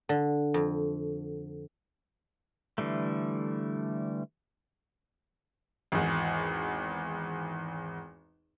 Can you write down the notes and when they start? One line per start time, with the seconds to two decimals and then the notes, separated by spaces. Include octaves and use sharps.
0.09 D3
0.54 F2
2.78 D3 E3 G3 A3
5.92 G#1 E2